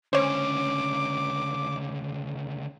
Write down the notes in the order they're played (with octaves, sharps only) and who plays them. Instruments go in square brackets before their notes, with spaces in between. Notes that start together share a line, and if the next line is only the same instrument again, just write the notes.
[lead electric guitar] C#2 D3 [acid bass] C#4 [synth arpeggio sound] C5 C#5 [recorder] D6